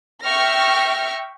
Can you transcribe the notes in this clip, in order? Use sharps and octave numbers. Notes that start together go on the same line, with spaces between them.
E5 G5 C#6 F6 A#6